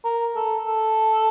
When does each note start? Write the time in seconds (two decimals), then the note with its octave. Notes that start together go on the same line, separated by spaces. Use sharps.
0.04 A#4
0.35 A4
0.65 A4